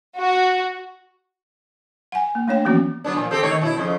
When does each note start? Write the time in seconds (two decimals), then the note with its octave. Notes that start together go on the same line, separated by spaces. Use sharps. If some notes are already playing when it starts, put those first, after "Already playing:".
0.17 F#4
2.12 F#5 G#5
2.35 A#3
2.48 A3 D4 C#5 G5
2.65 E3 F3 A#3 B3 C#4 F#4
3.04 F#3 B3 D4
3.16 A#2 F3
3.31 C4 G4 A4
3.43 D#3 A3 C#5
3.61 B2 E4
3.77 F2 C#3